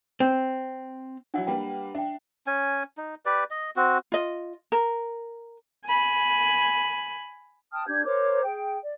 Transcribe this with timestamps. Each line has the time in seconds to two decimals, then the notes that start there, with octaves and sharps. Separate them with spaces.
0.20 C4
1.34 F#3 D4 E4 F#4 F#5
1.47 G3 A#3 B4 G5
1.95 D4 E5 G5
2.47 C#4 G#5
2.98 D#4
3.26 G4 B4 D5
3.50 D#5
3.76 C4 F#4
4.12 F4 D#5
4.72 A#4
5.85 G#5 B5
7.71 G5 A5 D#6 F6
7.87 D4 G4 G6 G#6
8.04 A#4 C5 C#5 D6
8.44 G#4 G5
8.82 D5